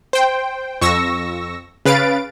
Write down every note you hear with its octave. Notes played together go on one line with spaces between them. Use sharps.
C5 G5
F2 C#6 E6 A#6
C#3 B4 F5 A6 D7